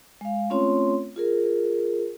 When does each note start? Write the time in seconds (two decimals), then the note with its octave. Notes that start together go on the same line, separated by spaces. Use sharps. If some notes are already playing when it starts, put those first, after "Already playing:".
0.21 G#3 F5
0.50 A3 C4 C#4 F4 C#5 C6
1.16 F4 G#4 A#4